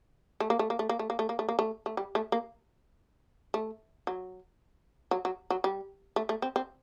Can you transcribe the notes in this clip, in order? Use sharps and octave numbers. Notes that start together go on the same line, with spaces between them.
A3
A#3
A3
A#3
A3
A#3
A3
A#3
A3
A#3
A3
A#3
A3
A3
G3
A3
A#3
A3
F#3
F#3
F#3
F#3
G3
A3
A3
C4
C4